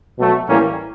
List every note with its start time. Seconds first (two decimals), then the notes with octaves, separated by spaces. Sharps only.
0.18 B2 F#3 A3
0.49 A2 E3 G3 A#3 C#4